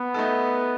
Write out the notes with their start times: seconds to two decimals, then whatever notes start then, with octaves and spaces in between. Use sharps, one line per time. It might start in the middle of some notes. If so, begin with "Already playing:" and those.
Already playing: B3
0.14 A3 D#4 A4